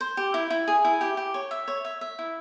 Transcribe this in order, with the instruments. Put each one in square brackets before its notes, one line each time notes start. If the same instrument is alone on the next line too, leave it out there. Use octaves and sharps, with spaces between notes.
[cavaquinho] C5
G4
E4
E4
G#4
E4
G4
G4
C#5
E5
C#5
E5
E5
E4